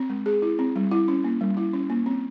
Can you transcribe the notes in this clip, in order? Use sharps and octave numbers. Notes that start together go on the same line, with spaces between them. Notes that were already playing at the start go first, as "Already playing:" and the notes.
Already playing: C4
G#3
G#4
E4
C4
G3
E4
C#4
A#3
G3
E4
C#4
A#3
C4